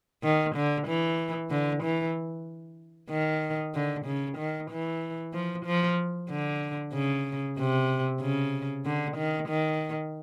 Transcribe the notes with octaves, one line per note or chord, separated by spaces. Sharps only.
D#3
D3
E3
D3
E3
D#3
D3
C#3
D#3
E3
F3
F3
D3
C#3
C3
C#3
D3
D#3
D#3